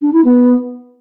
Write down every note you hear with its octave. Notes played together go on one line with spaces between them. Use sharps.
D4
E4
B3